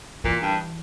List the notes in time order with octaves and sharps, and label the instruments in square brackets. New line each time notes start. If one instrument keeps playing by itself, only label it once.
[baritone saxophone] A#2 [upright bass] E3
[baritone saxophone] G2